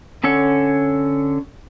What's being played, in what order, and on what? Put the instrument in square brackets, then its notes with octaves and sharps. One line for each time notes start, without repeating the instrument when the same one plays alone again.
[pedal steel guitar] D3 C#4 A4 C#5 F#5